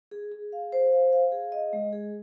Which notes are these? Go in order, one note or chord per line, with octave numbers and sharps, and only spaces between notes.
G#4
G#4
F5
C5
F5
F5
G#4
D#5
G#3
G#4